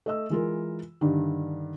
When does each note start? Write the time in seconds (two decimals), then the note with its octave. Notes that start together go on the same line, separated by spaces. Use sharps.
0.06 A3 D#5 E6
0.30 E3 G#3 F4 A#4
1.01 G2 D3 D#3